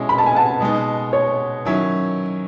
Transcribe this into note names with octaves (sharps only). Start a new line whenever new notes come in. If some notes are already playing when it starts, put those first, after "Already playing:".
Already playing: B2 G#3 C#4 E4
B5
A5
G#5
F#5 A5
B2 G#3 B3 D#4
C#5
D#3 F#3 C#4 E4